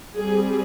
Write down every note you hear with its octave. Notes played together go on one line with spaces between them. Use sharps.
G3 C4 G#4